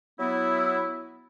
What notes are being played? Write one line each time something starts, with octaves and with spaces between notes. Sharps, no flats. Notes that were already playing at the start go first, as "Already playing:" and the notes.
F#3 B3 E4